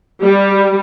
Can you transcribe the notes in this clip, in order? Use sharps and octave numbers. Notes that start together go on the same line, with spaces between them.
G3